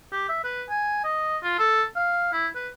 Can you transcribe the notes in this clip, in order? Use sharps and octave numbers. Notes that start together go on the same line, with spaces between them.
G4
E5
B4
G#5
D#5
F4
A4
F5
E4
B4